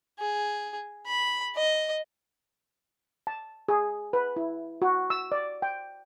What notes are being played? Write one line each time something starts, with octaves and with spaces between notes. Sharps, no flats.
G#4
B5
D#5
A5
G#4
B4
E4
F#4
E6
D5
G5